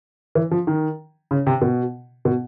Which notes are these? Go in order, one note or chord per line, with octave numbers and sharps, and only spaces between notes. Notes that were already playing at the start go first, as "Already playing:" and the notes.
E3
F3
D#3
C#3
C3
B2
B2